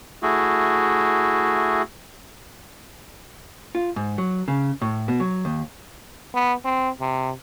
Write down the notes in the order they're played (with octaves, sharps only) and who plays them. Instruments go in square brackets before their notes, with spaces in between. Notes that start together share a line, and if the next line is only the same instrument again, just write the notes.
[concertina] A3 E4 F#4 G#4
[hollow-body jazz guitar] F4
G#2
F#3
C#3
A2
B2
F#3
D#2
[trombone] B3
C4
C3